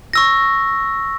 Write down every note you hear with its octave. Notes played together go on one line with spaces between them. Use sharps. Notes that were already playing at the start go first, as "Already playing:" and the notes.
C#6 E6 A#6